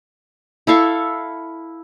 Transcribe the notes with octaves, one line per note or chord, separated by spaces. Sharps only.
E4 A4 F5 C#6